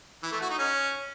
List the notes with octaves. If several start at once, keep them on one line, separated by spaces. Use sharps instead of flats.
E3
A3
F#4
D#4
C#4